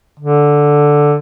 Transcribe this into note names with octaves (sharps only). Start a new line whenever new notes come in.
D3